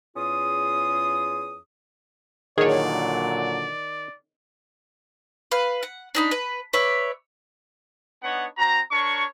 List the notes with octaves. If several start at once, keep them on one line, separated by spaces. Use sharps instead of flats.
E2 C#4 F4 G#4 D#6
A#2 D3 D#3 F#3 G#4 C#5 D5
B4 F5
F#5
D4 D#4 B5
B4
B4 C#5 D5 E5
B3 D4 D#4 C#5 F#5
C4 F#4 A#5
D4 A#4 C#5 C#6